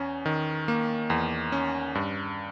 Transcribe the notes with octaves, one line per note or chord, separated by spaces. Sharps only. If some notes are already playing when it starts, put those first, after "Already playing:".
Already playing: E2 C#4
D#3
A#3
E2
C#4
G2